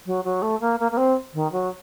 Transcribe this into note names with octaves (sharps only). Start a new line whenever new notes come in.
F#3
F#3
A3
A#3
A#3
A#3
C4
D#3
F#3